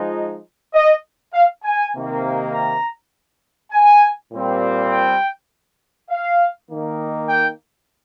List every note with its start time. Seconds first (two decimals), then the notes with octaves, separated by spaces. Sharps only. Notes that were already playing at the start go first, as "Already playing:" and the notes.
Already playing: F3 G#3 D#4
0.74 D#5
1.33 F5
1.63 G#5
1.93 C3 D#3 A#3
2.52 A#5
3.72 G#5
4.31 A#2 G3 C4
4.90 G5
6.10 F5
6.69 D#3 A#3 D#4
7.29 G5